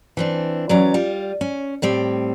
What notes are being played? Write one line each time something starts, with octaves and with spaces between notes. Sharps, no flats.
E3 C4 D4
E3 F#3 C#4 D5
G3 F4
C#4
A2 G3 C4